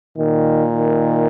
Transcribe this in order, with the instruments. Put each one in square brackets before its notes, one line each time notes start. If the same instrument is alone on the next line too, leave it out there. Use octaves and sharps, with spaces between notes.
[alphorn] A#2 [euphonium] D#3
[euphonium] D#3